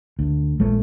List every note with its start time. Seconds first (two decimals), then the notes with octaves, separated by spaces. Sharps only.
0.19 D2
0.60 A#1 G#3 A3